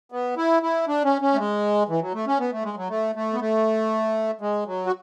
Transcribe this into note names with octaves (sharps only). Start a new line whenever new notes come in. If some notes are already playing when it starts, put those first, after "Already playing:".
B3
E4
E4
D4
C#4
C#4
A3
G#3
E3
F#3
A3
C#4
B3
A3
G#3
F#3
A3
A3
B3
A3
G#3
F#3
F#4